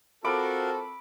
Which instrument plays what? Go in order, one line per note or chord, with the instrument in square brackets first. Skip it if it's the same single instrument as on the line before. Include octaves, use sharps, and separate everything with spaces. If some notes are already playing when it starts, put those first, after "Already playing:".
[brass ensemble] C4 A4 [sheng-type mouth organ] F4 F#4 A#4 [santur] B5 D6